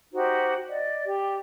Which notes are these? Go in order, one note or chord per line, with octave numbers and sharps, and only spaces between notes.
D#4 F#4 G4 C5
D5 D#5
G4